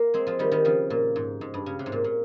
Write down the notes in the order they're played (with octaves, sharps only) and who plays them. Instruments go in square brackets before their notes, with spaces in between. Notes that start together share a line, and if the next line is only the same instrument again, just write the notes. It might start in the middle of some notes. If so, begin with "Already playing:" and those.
Already playing: [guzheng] A#3
G#3 C4
F3 G#3
D#3 G3
D#3 G3
C#3 F3
A#2
G#2
G#2
G2
C#3
C3
G#2
A#2
A#2